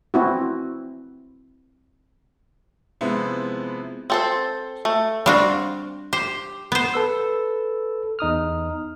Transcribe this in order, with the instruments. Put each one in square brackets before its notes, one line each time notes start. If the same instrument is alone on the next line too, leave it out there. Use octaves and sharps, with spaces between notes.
[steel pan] C4 E4 F#4
[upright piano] C3 F3 G#3 B3 C4 E4
[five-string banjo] C4 A4 C5
A3
[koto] G3 D4 F#4 [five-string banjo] C4 F5
[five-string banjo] G4 [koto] C5
[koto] B3 C5
[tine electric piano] A4 B4 E6
E2 D#4 D#6 F6